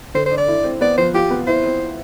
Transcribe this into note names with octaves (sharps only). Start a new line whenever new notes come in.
D3 C5
C5
D4
D5
E4
C4
B3 D5
F3 C5
F4 G4
B3
E4 C5
C4